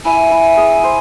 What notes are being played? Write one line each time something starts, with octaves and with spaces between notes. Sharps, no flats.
E4 G#5
E4
G#4
C5